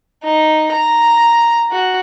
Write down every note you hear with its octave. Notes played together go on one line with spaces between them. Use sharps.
D#4
A#5
F#4